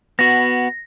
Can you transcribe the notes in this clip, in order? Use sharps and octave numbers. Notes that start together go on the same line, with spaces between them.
B3 F#4 A#6